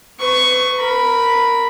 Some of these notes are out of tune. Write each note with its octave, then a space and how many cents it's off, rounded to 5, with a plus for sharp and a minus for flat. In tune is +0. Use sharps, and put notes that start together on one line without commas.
B4 +40 C#6 +0
A#4 -10 B5 +0